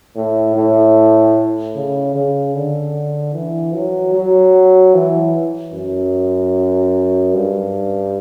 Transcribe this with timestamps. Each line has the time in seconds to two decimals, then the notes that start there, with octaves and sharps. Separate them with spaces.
0.16 A2
0.56 A2
1.75 C#3
2.15 C#3
2.55 D3
3.34 E3
3.75 F#3
4.14 F#3
4.94 E3
5.73 F#2
7.34 G2